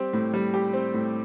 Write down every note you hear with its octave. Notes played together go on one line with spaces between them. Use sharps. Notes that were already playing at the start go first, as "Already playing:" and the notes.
Already playing: G3 C4 G4
A2
G3
G4
C4
A2